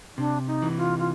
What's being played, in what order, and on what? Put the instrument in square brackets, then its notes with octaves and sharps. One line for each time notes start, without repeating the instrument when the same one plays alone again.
[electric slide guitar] C3 [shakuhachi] D4
[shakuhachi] D#4
[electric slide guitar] E3
[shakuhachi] F4
F4